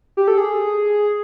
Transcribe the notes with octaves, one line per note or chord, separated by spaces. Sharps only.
G4
A4
G#4